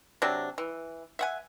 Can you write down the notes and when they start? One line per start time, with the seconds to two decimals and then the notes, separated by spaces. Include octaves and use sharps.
0.22 C3 F#3 D4
0.58 E3
1.19 E5 F#5 G#5